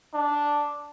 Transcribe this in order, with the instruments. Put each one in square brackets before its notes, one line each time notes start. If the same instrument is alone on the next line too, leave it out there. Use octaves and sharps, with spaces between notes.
[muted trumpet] D4